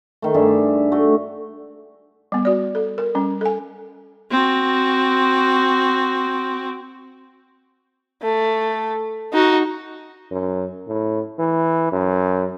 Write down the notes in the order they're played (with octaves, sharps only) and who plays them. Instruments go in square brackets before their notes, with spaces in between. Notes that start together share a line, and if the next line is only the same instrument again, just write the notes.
[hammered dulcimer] D#3 A3
G2 D4 G#4 E5
A3 F#4
[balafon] G3 B3
F#4 D5
A4
A#4
G3 C#4
A4 G#5
[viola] C4 F#4
[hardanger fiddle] A3
D#4 F#4
[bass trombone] F#2
A2
E3
F#2